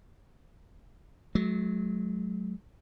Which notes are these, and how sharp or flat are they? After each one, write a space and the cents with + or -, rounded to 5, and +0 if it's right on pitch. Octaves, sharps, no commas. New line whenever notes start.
F#3 +0 A3 -45